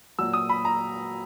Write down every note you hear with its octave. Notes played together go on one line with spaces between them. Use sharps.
A#2 F#3 E6
D#6
B5
A#5